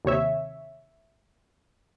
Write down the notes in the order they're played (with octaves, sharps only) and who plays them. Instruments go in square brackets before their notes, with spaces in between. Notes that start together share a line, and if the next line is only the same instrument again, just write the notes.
[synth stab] D#2 C3 C#5 E5